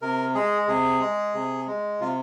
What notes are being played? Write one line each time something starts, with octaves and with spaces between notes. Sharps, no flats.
C3 A#4
G#3 G#4
C3 G#4
G#3
C3
G#3
C3 F4